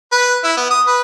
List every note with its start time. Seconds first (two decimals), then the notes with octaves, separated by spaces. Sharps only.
0.12 B4
0.44 E4
0.57 B3
0.70 D#6
0.87 B4